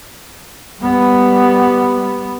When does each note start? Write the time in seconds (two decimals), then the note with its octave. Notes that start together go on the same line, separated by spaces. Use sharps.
0.81 G3 B3